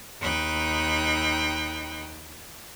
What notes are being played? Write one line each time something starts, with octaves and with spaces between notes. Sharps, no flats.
D#2 D#4 G5 B5 F#6